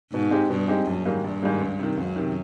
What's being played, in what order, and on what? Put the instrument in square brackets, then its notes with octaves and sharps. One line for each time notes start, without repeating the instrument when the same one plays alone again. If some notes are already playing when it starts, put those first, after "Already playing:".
[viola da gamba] G#2 [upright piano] B2
[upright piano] G#3 C4 D#4 G4
[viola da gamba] G2 [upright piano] B2
[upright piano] G#3 C4 D#4 G4
[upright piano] A#1 [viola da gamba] F#2
[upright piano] G#2 D#3 G3 A#3
[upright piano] A#1 [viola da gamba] G2
[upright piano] G#2 D#3 G3 A#3
C#2
C3 D#3
[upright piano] C#2 [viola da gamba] F#2
[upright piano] C3 D#3